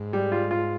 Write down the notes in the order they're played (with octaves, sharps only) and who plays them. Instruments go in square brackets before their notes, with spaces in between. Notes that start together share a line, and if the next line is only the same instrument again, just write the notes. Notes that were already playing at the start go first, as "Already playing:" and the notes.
Already playing: [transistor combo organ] G#2
[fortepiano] G3
F4
F4